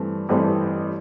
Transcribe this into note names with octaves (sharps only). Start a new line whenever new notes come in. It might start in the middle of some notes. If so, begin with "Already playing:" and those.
Already playing: G2 E3 A3 C4
A1 G2 E3 A3 C4